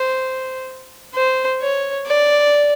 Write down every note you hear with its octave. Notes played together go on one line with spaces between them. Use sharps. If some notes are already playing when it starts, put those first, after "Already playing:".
Already playing: C5
C5
C#5
D5